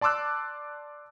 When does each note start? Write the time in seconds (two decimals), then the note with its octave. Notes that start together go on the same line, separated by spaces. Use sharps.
0.01 D5 A5 C6 D6 E6 F#6